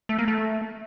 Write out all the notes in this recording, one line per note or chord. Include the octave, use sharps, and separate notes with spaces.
A3
A#3
A3